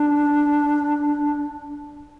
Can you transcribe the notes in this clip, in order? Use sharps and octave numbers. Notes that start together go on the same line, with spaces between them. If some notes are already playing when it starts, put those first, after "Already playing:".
Already playing: D4